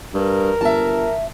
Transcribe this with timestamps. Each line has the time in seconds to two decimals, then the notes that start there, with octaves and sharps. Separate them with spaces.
0.14 G2 A#4
0.61 G1 E5 A5